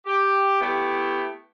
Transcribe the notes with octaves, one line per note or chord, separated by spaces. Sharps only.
G4
A3 B3 E4 G4